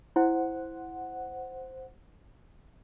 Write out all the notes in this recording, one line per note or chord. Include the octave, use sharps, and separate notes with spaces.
E4 C5 F#5